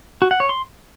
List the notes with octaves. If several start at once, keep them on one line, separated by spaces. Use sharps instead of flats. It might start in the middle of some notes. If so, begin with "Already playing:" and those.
F#4
F#5
C#5
C6